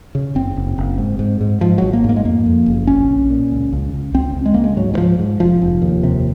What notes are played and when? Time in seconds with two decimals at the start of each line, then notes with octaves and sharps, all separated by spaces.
0.15 C#3
0.35 F#1 C4
0.56 F#1
0.78 F#1
0.98 G#2
1.19 G#2
1.41 G#2
1.61 G#2 F3
1.78 G#1 F#3
1.93 A#3
2.04 G#2
2.09 A#3
2.16 G#3
2.25 F2 A#3
2.46 F2
2.66 F#1
2.87 A#1 C#4
3.09 A#1
3.30 A#2
3.51 C#2
3.73 C#2
3.93 C#2
4.14 C#2 C4
4.36 C#2
4.46 G#3
4.54 C#2 A#3
4.64 G#3
4.76 G#2 F#3
4.94 D#3
4.98 G#2 F3
5.19 G#2
5.40 F1 F3
5.62 F1
5.82 D#2
6.03 C3